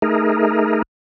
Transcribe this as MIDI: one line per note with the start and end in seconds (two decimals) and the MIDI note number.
0.02 0.82 57
0.02 0.82 63
0.02 0.82 68
0.02 0.82 70